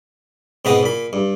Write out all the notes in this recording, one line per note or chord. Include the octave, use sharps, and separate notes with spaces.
G#2 B2 C4 B4 D#5 F#5
A#2 B5
G2